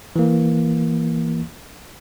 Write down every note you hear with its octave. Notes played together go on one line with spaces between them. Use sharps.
E3 A#3